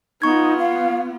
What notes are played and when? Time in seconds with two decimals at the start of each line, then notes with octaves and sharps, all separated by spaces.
0.22 B3 D#4 F4 C#6 G#6
0.58 F5